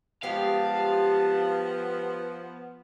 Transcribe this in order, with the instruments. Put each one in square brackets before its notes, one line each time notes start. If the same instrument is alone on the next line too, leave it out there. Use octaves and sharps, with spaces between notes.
[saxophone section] F3 B3 [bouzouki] G3 G#3 G4 [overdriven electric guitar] F5 [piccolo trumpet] A5